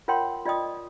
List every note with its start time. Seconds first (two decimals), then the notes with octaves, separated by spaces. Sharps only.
0.08 F4 A#4 C#5 F#5 G5 C6
0.45 F4 D5 D#5 G5 D#6